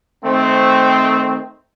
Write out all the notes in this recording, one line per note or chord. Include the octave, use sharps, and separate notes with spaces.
D#3 A3 C4